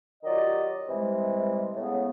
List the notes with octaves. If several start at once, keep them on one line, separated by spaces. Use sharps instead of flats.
D#3 F#3 F4 G4 D5 D#5
C3 E3 G3 G#3
A2 C#3 G#3 B3